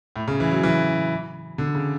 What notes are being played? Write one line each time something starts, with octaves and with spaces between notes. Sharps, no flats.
A2
C#3
E3
F#3
E3
D3
C#3